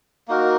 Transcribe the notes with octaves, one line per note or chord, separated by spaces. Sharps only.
A#3 D#4 F#4 A#4